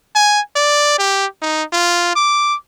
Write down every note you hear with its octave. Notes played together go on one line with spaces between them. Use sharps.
G#5
D5
G4
D#4
F4
D6